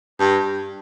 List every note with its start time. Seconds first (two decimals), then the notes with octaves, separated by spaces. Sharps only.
0.19 G2